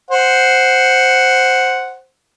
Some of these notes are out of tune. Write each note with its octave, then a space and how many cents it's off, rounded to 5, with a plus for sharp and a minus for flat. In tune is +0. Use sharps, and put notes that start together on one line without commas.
C5 +0 F#5 +0